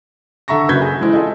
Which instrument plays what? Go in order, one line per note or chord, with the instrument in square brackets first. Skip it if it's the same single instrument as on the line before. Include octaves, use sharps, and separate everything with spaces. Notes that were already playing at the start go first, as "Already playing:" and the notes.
[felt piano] D3 A4 E5 A#5 C#6 A#6
F#1 F#2 B4 G6 G#6 B6
G#4
E3 G#3 C4 E4
F4 G#4 A4 D#5